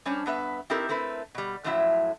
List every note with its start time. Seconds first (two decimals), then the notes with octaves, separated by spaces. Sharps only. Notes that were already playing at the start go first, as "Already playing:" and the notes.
0.06 G3 C#4 D4 C5 C#5
0.26 G2 B3 B4 E5
0.70 C4 D#4 E4 G4 A4 A#4
0.89 A3 C4 E4 A#4 B4
1.35 B2 G3
1.64 F#2 A2 F3 F#3 E4 E5